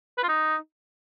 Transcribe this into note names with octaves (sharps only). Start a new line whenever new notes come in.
B4
F4
D#4